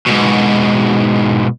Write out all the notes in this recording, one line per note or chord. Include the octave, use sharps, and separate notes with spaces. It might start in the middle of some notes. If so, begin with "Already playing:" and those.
G#2 B2